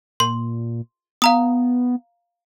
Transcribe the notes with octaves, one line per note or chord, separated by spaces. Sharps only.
A#2 C6
B3 F5 A#5 D#6